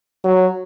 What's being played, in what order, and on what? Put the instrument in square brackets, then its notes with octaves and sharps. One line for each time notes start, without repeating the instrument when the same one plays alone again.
[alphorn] F#3